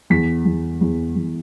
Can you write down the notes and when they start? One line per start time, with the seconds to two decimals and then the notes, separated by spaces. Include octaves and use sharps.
0.10 E2 B6
0.46 E2
0.81 E2
1.16 E2